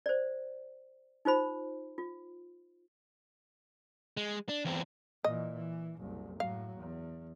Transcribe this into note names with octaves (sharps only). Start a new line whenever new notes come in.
C5 D5
D#4 F4 C5 B5
F4
G#3
D4
E2 C4
A#2 E3 D#5
E3
F#1 C2
A2 F#3 F5
E2